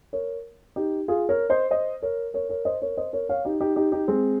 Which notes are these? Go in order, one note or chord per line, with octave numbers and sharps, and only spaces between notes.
A#4 C#5
D#4 G4
F4 G#4
A#4 C#5
C5 D#5
C5 D#5
A#4 C#5
A#4 C#5
A#4 C#5
C5 D#5
A#4 C#5
C5 D#5
A#4 C#5
C#5 F5
D#4 G4
D#4 G4
D#4 G4
D#4 G4
G#3 C4